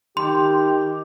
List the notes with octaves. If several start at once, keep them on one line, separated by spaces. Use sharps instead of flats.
D#3 G4 C6